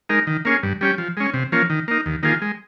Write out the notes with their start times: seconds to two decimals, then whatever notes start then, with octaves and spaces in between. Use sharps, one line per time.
0.09 G#3 D#4 A#4
0.27 D#3
0.45 A#3 C#4 G#4
0.63 G2
0.81 G3 C#4 G4
0.98 F3
1.17 G#3 C#4
1.34 C3
1.52 F3 A#3 C#4
1.70 D#3
1.88 A#3 D#4
2.06 D#2
2.23 D#3 A#3 F4 G#4
2.42 G#3